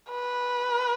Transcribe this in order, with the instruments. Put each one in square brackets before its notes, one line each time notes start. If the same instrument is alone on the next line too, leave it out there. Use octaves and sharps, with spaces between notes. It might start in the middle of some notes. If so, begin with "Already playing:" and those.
[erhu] B4